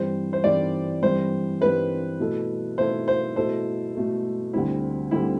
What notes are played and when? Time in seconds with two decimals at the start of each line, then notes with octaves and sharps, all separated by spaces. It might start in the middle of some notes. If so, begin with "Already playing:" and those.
Already playing: G2 E3 G3 C4 C5
0.33 C5
0.43 G2 E3 G3 C4 D5
1.02 G2 E3 G3 C4 C5
1.61 G2 E3 G3 C4 B4
2.19 B2 A3 E4 A4
2.78 B2 A3 E4 A4 C5
3.08 C5
3.36 B2 A3 E4 A4 C5
3.94 B2 A3 E4 A4
4.53 D2 D3 G3 C4 E4
5.11 D2 D3 G3 C4 E4